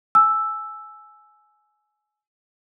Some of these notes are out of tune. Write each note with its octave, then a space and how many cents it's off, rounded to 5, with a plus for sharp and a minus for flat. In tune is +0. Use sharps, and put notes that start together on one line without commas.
G#5 +20 E6 +0